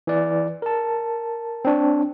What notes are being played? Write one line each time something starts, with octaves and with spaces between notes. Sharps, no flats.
E3 D5
A#4 A5
C4 D4